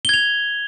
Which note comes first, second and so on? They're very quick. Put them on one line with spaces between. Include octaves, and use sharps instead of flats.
G7 G#6 F7